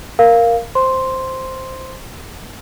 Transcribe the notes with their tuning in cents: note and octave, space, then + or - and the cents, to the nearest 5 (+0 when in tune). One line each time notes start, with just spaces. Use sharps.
A#4 +0 F5 -5
C5 +0 C6 +0